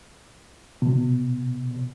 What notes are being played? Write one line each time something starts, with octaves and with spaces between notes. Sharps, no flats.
B2